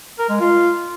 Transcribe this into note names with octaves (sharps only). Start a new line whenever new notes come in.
A#4
G#3
F4